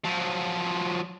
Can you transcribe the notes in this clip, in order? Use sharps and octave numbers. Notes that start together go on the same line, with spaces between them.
F3 F#3